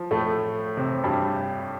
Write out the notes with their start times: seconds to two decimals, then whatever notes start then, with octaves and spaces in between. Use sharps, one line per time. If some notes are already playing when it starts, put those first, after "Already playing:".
Already playing: F3
0.11 A2 A3
0.77 C3 C4
1.04 G2 G3